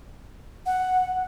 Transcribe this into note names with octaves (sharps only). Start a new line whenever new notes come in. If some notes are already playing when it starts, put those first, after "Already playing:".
F#5